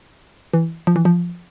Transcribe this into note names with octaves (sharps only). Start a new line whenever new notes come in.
E3
F3
E3
F3